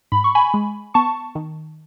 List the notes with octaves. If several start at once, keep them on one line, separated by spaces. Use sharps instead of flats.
G#2 B5
C#6
G#5 B5
G#3
B3 A5 C#6
D#3